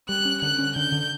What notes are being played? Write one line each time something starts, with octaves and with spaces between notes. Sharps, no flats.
G3 F#6
C#4
D3 F#6
C#4
D3 G6
D3